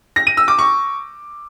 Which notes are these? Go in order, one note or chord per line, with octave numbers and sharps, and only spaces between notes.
A#6
D#7
E6
D6
C#6